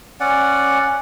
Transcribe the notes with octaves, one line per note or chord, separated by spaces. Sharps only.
C#4 D5 F#5